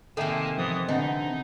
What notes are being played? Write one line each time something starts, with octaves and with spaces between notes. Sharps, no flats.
C3 D#3 A#3 A4 E5 G#5 A5
E3 F3 B3 C5 D#6
D3 E3 B3 C4 D#4 D#5 F#5